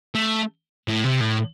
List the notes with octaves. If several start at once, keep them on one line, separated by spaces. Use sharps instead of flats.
A3
A2
C3
A2